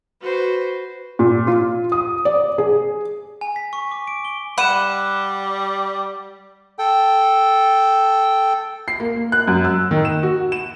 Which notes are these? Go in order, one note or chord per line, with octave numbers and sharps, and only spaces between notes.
F#4 B4 C5
A#2
F4
D#6
D5
G#4
G#5
B6
C#6
D6
D7
G7
G3 F#5 B5 D#7 E7
A4 G5
C7
A#3
A#3
F#6
F#2
E6
D#3
E7
F#4
E7